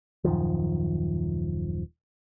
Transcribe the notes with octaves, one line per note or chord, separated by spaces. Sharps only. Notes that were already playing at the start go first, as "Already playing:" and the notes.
D#1 F#2 D#3 F3